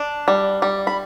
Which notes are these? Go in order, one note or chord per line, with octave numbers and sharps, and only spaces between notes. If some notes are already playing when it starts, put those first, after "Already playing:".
Already playing: D4
G3
G3
B5